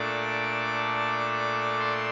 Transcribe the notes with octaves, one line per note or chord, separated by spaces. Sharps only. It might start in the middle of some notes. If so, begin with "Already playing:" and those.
Already playing: A#2 A3 D4 D6
C6